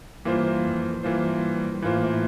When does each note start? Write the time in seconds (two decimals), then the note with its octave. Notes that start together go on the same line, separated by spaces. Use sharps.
0.25 G2 E3 A#3 F4 C5
0.64 F2
1.03 G2 E3 A#3 F4 C5
1.82 A2 E3 A#3 F4 C5